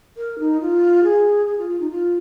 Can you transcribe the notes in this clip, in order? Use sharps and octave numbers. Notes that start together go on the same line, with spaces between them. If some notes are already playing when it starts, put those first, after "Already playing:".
A#4
D#4
F4
G#4
G#4
F4
F4
D#4
F4